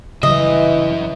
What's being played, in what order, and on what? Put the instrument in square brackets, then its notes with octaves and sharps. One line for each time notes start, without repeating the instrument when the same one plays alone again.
[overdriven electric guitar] F#2 E5 [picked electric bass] C#3 F#3 G3 [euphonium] E3 [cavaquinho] D#5